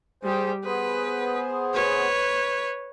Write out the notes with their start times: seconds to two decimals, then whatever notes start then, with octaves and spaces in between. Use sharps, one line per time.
0.23 G3 G4 G#4 C5
0.64 B3 G#4 B4 C5
1.74 B4 C#5